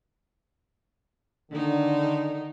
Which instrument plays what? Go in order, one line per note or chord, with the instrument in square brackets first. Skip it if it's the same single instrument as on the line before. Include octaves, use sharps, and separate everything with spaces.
[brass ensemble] D3 [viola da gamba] D#3 D#4